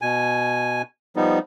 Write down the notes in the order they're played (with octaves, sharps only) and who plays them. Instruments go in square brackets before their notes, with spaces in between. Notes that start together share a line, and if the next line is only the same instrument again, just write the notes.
[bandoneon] B2 G#5
F3 G3 B3 D#4